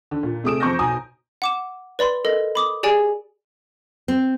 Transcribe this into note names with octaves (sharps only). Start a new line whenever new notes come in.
D3
A#2
C3 A3 G#4 D#6 D7 E7
F2 C4 C#6 D6 G6 A#6
B1 B2 G#5 A#5 D#6
F#5 D6 E7
B4 D5 B5 C6
A4 A#4 D#5
B5 D6 D#6
G4 G#4 D5 G#5 D7
C4